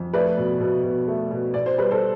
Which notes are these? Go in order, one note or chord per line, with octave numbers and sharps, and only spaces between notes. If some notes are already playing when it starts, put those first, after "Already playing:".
Already playing: F2
A3 B4 D5
B2
B2
B2
A3
B2
B2 D5
C5
G3 B4
A4 C5